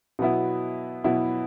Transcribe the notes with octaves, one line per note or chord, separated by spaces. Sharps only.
B2 F#3 B3 E4
B2 F#3 B3 E4